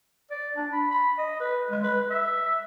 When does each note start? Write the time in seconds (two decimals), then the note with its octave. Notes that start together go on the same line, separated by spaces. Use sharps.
0.31 D5
0.56 D4
0.73 B5
0.91 B5
1.18 D#5
1.40 B4
1.71 G#3
1.83 B4
2.10 E5